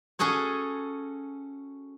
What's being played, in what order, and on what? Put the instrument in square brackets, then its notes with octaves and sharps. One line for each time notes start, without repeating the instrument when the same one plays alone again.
[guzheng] C#4 F#4 G#4 A4 C#5